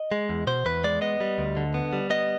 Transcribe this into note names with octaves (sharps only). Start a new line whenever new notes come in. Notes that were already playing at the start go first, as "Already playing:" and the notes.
Already playing: D#5
G#3
E2
B2 C5
E2 B4
G#3 D5
B3 D#5
G3
D2
D3
B3
G3
B3 D#5